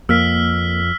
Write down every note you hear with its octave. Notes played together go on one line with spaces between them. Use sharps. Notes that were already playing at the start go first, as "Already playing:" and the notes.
F2 A#3 E6 F6 B6